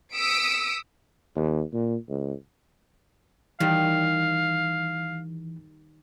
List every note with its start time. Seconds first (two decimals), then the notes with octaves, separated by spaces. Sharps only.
0.14 D#6 E6 B6 C#7 D7
1.35 D#2
1.73 A#2
2.09 C#2
3.60 D#3 E3 G3 F5